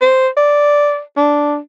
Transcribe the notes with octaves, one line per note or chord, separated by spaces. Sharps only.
C5
D5
D4